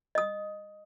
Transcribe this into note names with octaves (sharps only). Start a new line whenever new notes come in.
D#5 D#6